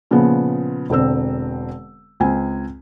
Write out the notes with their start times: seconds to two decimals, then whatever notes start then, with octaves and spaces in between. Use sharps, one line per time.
0.11 A#2 C#3 F3 B3
0.90 E1 D3 C4 E6
2.20 C#2 C4 G#5